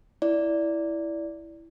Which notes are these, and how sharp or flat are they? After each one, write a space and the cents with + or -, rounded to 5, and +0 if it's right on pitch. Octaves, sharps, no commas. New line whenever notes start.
E4 +0 D5 -10